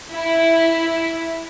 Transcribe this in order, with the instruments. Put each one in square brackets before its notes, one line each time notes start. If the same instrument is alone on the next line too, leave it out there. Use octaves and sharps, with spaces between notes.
[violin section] E4